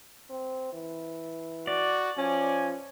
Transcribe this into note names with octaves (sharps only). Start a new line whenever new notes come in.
C4
E3
F#4 D5
F3 C#4 G#5